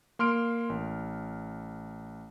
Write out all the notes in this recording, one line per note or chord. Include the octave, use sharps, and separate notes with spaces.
A#3 C6 F6 D7
A1